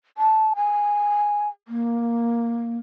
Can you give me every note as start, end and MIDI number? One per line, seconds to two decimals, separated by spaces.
0.18 0.54 81
0.56 1.49 80
1.68 2.78 58